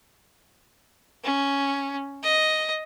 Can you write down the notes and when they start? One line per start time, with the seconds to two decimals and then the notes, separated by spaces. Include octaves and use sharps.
1.24 C#4
2.23 D#5